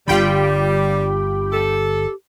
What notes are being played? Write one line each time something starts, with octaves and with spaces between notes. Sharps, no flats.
G1 D3 G3 F4 G4 G5 B5
A4